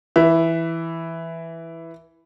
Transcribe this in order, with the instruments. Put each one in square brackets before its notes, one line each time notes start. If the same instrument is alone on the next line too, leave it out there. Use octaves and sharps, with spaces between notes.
[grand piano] E3 E5